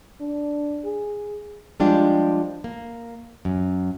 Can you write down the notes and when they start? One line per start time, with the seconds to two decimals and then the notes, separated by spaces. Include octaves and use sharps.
0.21 D4
0.85 G#4
1.80 F3 G3 G#3 D4 F4 G4
2.64 A#3
3.45 F#2